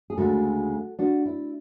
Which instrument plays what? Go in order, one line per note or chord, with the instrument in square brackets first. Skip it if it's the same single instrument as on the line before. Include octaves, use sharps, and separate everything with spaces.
[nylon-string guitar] G#4
D2 C#3 G#3 F#4 A4
D4 F#4
E4